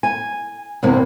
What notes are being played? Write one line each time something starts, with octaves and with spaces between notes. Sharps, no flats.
G#5
E2 G2 C3 A#3 C4